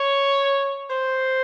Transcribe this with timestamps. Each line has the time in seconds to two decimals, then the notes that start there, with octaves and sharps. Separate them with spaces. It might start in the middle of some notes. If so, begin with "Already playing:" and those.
Already playing: C#5
0.89 C5